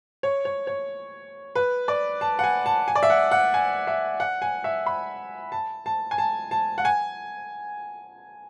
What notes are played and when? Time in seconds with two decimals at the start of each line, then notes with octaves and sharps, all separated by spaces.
0.23 C#5
0.45 C#5
0.67 C#5
1.55 B4
1.88 D5
2.21 A5
2.39 F#5
2.44 G#5
2.66 A5
2.88 G#5
2.95 D5
3.03 E5
3.10 F#5
3.31 F#5
3.54 G#5
3.87 E5
4.20 F#5
4.42 G#5
4.64 E5
4.86 B5
5.52 A5
5.86 A5
6.11 G#5
6.18 A5
6.51 A5
6.78 F#5
6.85 G#5